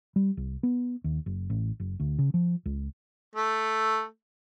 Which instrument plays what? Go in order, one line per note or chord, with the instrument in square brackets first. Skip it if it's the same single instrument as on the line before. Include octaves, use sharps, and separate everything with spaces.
[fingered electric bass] G3
C2
B3
D#2
F#1
A1
F#1
D2
C#3
F3
C#2
[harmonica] A3